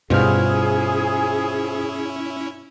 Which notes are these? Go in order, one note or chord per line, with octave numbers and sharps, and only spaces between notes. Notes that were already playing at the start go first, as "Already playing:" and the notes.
G2 B2 C#4 E4 F4 G#4 C5 F6